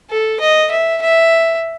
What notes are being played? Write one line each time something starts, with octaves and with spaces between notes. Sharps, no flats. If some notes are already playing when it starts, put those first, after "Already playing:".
A4
D#5
E5
E5